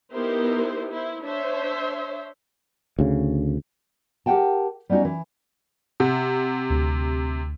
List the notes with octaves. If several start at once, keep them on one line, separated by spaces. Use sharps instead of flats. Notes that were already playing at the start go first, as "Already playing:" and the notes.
B3 D#4 E4 G4 A#4 C5
E4 C5
D4 C5 C#5 E5
D2 C#3
G4 A#4 B4 F#5 G5 A5
G3 B3 C#4 D#4 F#4
E3
C3 F#5
D2